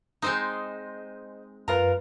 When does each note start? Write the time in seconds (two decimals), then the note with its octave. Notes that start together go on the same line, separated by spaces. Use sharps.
0.22 G#3 C4 D#4 C5 D#5
1.68 F#2 F4 A#4 B4 A#5